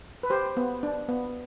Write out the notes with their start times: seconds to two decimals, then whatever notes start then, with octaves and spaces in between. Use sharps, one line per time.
0.23 B4
0.30 G4 C5
0.57 B3
0.83 D4
1.09 B3